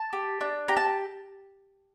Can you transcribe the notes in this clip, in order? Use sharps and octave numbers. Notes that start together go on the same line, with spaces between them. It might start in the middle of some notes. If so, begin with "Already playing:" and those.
Already playing: A5
G4
D4
G4 A#5
A5